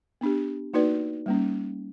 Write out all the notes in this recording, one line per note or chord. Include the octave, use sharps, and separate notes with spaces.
B3 D4 G4
A#3 D#4 F#4 B4 D5
G3 A#3 C#4